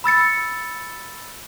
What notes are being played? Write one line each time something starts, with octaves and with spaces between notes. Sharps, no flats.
B5 E6 A6 C#7